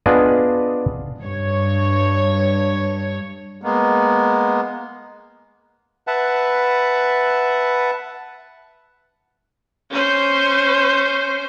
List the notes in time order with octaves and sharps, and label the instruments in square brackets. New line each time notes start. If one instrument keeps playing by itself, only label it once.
[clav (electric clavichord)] B3 D4 F4 G#4 D5 D#5
[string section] G2 C#5
[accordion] G#3 A#3 B3
[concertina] B4 E5 F#5 A5
[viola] C#4 C5